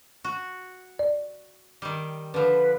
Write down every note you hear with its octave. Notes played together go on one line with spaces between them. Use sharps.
F#4
D5
D#3 G3
D3 F3 B4